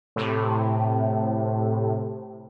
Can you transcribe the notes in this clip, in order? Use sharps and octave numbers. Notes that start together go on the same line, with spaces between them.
A2 C3